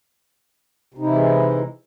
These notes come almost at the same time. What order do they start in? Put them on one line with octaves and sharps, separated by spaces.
C3 D#4 E4 E3 G#3